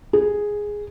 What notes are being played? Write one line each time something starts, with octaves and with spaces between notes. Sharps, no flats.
G#4